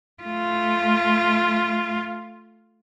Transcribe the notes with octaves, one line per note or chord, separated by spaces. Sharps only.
A3 F4